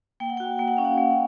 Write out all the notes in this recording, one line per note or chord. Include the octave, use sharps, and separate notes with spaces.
A#3 G5
F#5
G5
F#4
A#3 G5
F#5
C#4 F5
F#5
A#3